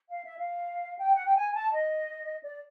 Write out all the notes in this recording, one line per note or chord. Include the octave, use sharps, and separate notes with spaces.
F5
E5
F5
G5
F#5
G5
G#5
A5
D#5
D5